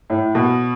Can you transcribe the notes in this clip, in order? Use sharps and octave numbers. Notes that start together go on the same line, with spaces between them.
A2
B2